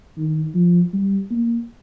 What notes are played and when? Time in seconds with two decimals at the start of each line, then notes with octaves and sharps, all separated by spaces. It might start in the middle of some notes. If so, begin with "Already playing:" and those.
0.18 D#3
0.55 F3
0.93 G3
1.31 A#3